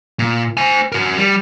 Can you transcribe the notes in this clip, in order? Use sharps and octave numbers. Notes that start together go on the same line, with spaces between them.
A#2
C5 G#5
F#4 A#4
G3